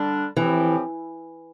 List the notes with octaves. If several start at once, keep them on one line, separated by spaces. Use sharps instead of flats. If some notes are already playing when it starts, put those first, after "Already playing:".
Already playing: D3 G3 D4
A2 E3 F3 C4 G4